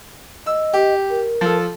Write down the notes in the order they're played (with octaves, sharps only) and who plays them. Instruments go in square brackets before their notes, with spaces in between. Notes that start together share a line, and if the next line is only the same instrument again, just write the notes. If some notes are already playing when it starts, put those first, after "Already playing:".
[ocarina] D#5 [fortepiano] E6
[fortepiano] G4
[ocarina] A#4
[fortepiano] F3 A4